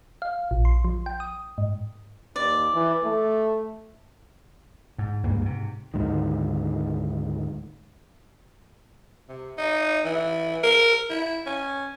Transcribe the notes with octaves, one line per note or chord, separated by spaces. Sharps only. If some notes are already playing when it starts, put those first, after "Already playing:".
F5
A#1
C6
F3
G5
D#6
G#2
D#2 D5
E3
A3
G#2
C#2 G2 A#3
G#2 C3
D2 G#2 D#3
C3
D#4
E3
A#4
E4
C#4